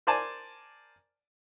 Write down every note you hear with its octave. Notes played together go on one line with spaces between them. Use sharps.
A#4 C5 D5 G#5 A5